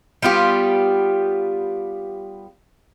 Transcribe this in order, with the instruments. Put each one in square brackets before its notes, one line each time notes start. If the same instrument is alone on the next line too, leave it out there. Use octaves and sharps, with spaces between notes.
[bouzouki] G3 B3 F4 G4